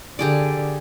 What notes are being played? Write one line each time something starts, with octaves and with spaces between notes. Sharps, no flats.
D3 G4 G#4 D5